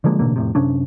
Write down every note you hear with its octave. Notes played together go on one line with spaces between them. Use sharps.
D3 F3 G#3 A#3
A1 B2 D3 A#3
F1 A2 C3
F#2 C3 C#4 D4